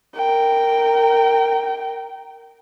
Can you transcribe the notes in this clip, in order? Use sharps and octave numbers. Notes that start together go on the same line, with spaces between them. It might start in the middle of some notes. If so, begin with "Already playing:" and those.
A#4 G5